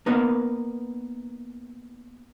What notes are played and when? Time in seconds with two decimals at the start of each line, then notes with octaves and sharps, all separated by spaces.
0.06 A#3 B3 D#4 A#4 B4